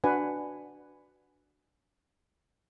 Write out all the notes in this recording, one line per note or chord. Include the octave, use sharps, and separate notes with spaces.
D4 F#4 B4 F#5 G#5